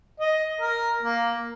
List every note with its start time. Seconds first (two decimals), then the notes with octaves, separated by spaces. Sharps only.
0.20 D#5
0.61 A#4
1.03 A#3